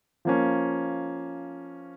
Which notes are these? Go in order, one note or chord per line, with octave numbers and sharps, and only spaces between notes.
F3 A#3 C#4